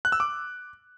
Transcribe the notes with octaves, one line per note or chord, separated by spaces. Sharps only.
F#6
E6
D6